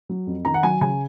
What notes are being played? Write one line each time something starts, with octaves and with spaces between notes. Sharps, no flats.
F#3
F2
D#3 A#5
F#5
F#3 G#5
C#3 G#5